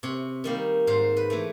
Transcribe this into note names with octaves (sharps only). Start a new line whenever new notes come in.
C3 C#5
D#3 G3 A#3
G#2 C5
B4
E3 A3